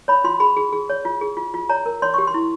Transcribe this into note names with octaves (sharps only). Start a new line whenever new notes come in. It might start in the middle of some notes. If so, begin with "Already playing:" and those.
C#5 B5
F4 C6
G#4 B5
G#4
G#4
C#5
F4
G#4
F4
F4
C#5 A#5
A#4
C#5 C6
G4 C#6
C6
E4